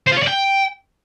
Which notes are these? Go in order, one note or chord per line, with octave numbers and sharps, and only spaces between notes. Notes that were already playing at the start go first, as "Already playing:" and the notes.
C5
F4
C#5
D5
G5